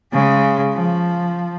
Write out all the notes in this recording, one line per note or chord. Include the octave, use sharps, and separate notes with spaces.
C#3 G#3
F3